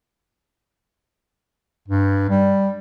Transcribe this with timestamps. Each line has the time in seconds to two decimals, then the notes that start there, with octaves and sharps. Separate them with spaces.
1.88 G2
2.30 G3